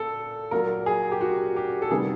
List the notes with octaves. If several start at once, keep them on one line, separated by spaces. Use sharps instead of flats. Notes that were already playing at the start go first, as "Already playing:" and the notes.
Already playing: A#2 A4
A#2 F#3 A#3 A#4
G#4
G4
F#4
G4
A4
C3 D#3 G3 B3 G#4